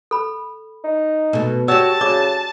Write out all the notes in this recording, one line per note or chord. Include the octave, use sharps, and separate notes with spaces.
A4 B5
D#4
B2 A3
F#4 G4 C#5 A5 E6
C#3 F#4 D5 D6